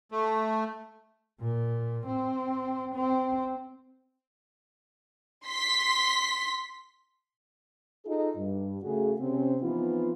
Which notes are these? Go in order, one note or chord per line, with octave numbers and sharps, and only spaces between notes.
A3
A#2
C4
C4
C6 B6
D#4 F4 G#4 A4 D#5
G2
C#3 A3 F#4 G#4
C3 C4 C#4
E3 F3 B3 C4 D#4 F4